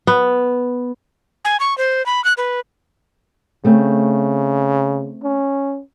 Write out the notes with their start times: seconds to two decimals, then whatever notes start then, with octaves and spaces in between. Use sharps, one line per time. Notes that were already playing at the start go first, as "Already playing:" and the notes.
0.07 B3
1.45 G#5
1.60 C#6
1.78 C5
2.06 B5
2.24 F#6
2.37 B4
3.65 C#3 A3 C4
5.23 C#4